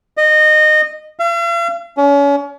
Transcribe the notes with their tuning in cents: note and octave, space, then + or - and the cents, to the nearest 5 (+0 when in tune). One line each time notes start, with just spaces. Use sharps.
D#5 -25
F5 -45
C#4 +35